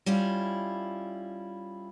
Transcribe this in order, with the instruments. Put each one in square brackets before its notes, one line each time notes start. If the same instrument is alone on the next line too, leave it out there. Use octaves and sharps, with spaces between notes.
[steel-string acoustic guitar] G3 C#4 E4 F4